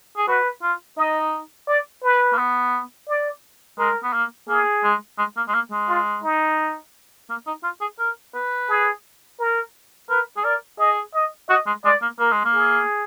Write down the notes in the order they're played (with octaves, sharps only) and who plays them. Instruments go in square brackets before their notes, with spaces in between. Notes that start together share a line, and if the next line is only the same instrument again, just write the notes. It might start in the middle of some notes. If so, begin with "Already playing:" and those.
[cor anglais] G#4
[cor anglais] F#4 [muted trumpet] B4
[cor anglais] F4
[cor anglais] D#4 [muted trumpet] D#5
[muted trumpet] D5
B4
[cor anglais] A#3
B3
[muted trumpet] D5
[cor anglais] G#3 [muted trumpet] A#4
[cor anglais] B3
A#3
[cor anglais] A#3 [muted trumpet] G#4
[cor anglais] G#3
G#3
A#3
G#3
A#3
G#3
[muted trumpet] F4
D#4
[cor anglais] A#3
D#4
F4
G#4
A#4
B4
[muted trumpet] G#4
A#4
[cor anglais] A#4 [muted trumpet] B4
[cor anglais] G#4
[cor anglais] A#4 [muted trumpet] D5
[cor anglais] G#4 [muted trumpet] D#5
[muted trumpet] D#5
[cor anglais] F#4 [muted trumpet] D#5
[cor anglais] G#3
[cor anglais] G#3 [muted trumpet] D5
[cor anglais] A#3
[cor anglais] A#3 [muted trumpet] A#4
[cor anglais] G#3
A#3
[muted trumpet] G#4